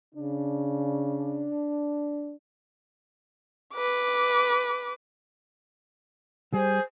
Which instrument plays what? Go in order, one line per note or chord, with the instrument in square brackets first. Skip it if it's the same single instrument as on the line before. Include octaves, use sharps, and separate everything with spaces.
[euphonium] C#3 [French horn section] D4
[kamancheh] B4 D6
[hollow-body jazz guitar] G3 [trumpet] G#4 [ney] C5